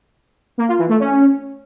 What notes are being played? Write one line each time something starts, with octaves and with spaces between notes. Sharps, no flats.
A#3
F4
E3
A3
C#4